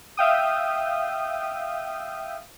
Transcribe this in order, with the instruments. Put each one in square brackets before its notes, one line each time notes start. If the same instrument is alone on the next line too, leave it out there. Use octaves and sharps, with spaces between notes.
[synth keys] E5 F5 G5 D#6